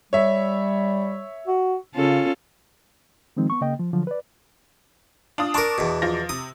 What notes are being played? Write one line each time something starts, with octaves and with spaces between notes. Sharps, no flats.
G3 C#5 E5
F#4
C#3 C#4 F4 A4
D#3 F3 G#3 C4 D#4
B3 C#6
C#3 A#3 D#5 G5
F3
D3 F3 F#3
B4 D5
D4 F4 D#6
D4 A#4 A5 C#6 D6
E2 B2
F3 F4 A#6
C3 D#6